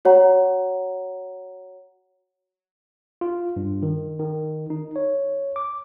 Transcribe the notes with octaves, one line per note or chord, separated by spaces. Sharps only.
F#4 C#5 F#5 A#5
F4
G2
D#3
D#3
D#4
C#5
D6